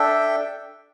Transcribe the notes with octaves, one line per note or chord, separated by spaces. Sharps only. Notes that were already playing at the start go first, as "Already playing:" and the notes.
Already playing: D4 A4 E5 G5